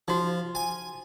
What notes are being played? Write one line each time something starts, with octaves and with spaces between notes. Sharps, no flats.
F3 D#4 F#4
G#5